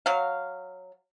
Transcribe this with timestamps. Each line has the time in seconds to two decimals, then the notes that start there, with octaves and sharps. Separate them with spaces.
0.06 F#3 F5